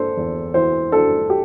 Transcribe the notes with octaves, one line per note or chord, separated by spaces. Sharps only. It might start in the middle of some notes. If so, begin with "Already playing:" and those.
Already playing: A#3 D4 A4 C5
E2
E3 C5
D4 A4
G4